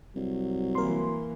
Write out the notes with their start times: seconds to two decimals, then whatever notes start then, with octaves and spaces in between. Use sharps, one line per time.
0.16 C2 F#3
0.75 E3 A#3 A#4 C6